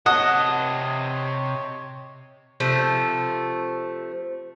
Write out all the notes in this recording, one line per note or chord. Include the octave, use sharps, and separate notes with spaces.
C3 C#5 D#5 F#5 A5
C3 F3 A3